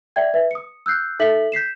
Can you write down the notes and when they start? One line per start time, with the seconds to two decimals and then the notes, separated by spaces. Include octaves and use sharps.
0.16 D5 E5 G5 G#6
0.34 B4 E5
0.51 D#6 C#7
0.86 E6 F#6 G6 C7
1.19 D#4 A4 E5 B6 F#7
1.52 G6 B6 C7 E7